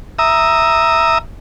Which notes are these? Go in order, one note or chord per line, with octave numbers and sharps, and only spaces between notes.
E5 A#5 D#6